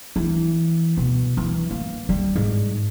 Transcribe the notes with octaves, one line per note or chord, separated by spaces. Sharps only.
E3
B2
E3
A#3
G3
G#2